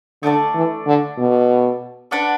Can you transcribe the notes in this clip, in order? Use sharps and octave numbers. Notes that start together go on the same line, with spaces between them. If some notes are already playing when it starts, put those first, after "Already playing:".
D3 A3 D4 A4 D5
E3
D3
B2
D4 B4 D5 F#5